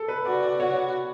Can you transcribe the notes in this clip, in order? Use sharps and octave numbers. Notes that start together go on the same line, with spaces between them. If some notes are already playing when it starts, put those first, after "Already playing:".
Already playing: A4
B4
F#4 D5
D5
F#4 C#5